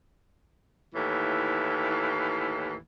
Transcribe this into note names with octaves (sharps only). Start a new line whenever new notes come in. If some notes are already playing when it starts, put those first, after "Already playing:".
D#2 A2 E3